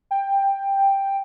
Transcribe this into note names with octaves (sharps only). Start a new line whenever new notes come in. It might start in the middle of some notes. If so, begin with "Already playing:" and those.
G5